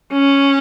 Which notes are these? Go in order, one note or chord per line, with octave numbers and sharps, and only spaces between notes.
C#4